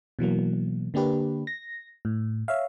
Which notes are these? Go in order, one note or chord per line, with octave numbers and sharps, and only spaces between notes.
B2 E3 F#3 A#3
D3 A#3 D4 G4 B4
A#6
A2
C#5 E5 F5